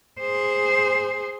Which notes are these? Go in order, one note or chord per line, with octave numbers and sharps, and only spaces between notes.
G#4 C5